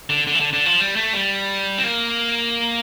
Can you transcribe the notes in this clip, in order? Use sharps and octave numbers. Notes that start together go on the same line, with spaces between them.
D3
D3
E3
D3
D3
F3
G3
A3
G3
C4
A#3